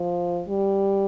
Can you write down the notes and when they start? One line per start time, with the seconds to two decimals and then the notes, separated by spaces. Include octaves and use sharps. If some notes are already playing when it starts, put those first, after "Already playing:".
Already playing: F3
0.48 G3